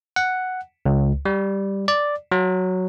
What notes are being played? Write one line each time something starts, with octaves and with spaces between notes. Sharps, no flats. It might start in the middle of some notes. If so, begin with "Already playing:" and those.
F#5
C#2
G3
D5
F#3